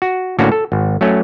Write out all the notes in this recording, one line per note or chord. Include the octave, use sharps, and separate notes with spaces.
F#4
A2 D3 A#3 C#4 F#4
A4
G#1
F#3 A3 C#4